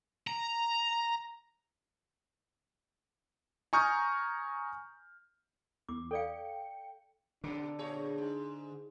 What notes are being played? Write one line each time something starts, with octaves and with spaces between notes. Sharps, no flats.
A#5
G#5 A#5 C#6 D#6 F6 G6
E2 D6
A4 D5 F5 G5 C#7
B2 D3 D4
A#2 G#4 C#5
G#2